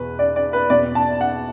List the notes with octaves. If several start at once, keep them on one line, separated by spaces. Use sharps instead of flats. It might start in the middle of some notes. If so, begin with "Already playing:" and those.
Already playing: E2 B2 B4
D5
D5
B4
E2 B2 D5
A5
F#5